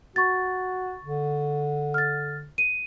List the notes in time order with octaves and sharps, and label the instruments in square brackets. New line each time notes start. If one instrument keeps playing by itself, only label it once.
[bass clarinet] F#4 [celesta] C#6 A6
[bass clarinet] D3
[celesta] F6 A6
D#7